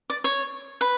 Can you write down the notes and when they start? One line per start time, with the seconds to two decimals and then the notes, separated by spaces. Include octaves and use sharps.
0.10 D5
0.24 C#5
0.81 B4